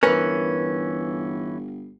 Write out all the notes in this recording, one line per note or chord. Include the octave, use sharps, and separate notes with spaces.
G1 E3 C#4 A#4 B4 G#5